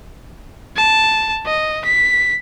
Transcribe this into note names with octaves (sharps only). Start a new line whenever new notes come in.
A5
D#5
B6